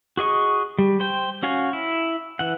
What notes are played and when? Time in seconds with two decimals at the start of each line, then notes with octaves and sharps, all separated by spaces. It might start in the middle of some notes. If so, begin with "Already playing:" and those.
0.17 F#4 G#4 D#5 C#6
0.79 G3
1.00 C5 G5
1.43 C#4 F#4 F5 G#5
1.73 E4
2.39 E3 F#5